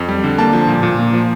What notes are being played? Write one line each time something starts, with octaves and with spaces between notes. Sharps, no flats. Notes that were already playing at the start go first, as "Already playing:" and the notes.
Already playing: F2
G3
D3
A#3 A5
F3
A#2
A#2
A#3
F3